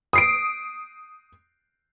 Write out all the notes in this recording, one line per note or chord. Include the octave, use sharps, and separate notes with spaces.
D#6 C7 D7